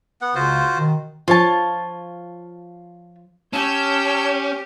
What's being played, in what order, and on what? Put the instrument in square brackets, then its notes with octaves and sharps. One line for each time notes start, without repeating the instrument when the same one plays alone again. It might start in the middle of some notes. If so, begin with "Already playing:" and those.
[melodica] B3 F#5
[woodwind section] C#2 C#3 [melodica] F4 F#4 C5
[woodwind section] B2 D#3
[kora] F3 C#5 [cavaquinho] F4 A5
[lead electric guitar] C#4 [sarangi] G4 [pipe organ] C#5 E6 G6 [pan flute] A5